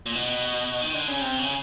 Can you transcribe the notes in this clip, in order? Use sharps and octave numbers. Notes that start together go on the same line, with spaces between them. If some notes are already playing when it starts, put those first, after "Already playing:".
A#2
B2
D#3
D3
C#3
C3
C#3